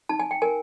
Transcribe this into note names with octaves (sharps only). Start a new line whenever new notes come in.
D#4 A5
G#5
G5
A#4 G#5